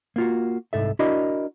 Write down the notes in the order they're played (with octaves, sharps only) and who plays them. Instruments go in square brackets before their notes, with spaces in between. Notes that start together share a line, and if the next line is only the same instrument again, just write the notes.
[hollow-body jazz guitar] A#3 F4 F#4
C2 G#2 A4 E5
D4 E4 F#4 A#4 D#5 B5